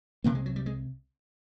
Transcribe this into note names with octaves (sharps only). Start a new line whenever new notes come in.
C2 C3 A#3
G#3
F#3
G3
G#3